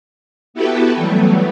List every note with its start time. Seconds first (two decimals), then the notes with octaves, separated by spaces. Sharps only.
0.54 B3 E4 F#4 G4 A4 B4
0.96 E3 F#3 G3 A3 B3